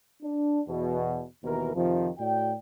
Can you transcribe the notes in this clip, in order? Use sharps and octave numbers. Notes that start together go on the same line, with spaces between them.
D4
E2 B2
D#2 B2 E3 A#4
F2 C3 D#3 F3
A2 F#4 D5 G5